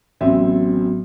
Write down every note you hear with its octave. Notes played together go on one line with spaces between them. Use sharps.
A1 F#3 B3 C4 F#4 E5